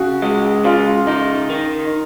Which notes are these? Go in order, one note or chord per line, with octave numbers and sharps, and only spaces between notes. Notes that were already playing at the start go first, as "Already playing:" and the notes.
Already playing: C#3 F#4
G#3
C#3 F4
D#4
D#3